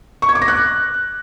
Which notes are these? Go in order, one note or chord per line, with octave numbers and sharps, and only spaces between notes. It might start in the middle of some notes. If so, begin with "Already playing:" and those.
C#6
G#6
D6
A#6
F#6